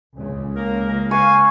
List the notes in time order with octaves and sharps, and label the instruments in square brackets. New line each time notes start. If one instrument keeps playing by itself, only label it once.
[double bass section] C#2 C#3
[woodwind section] A#3 A#4
[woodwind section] B4 F5 [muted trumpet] G#5 [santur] C#6